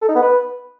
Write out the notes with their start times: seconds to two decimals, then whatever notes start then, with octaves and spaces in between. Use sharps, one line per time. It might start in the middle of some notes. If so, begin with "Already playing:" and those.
0.02 A4
0.09 D#4
0.15 B3
0.22 B4